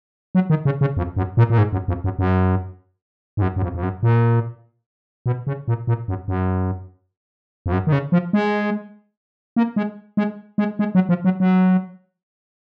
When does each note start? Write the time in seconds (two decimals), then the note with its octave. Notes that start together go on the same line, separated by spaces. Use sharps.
0.35 F#3
0.50 D#3
0.65 C#3
0.81 C#3
0.97 F2
1.16 F#2
1.37 A#2
1.50 A#2
1.58 G#2
1.73 F#2
1.88 F2
2.04 F#2
2.19 F#2
3.37 G#2
3.42 F#2
3.56 F#2
3.62 F2
3.74 F2
3.83 F#2
4.03 A#2
5.26 B2
5.47 C#3
5.68 A#2
5.87 A#2
6.08 F#2
6.28 F#2
7.66 F2
7.72 F#2
7.87 D#3
7.92 C#3
8.12 F3
8.33 G#3
9.56 A#3
9.76 G#3
10.17 G#3
10.58 G#3
10.79 G#3
10.95 F#3
11.09 F3
11.25 F#3
11.40 F#3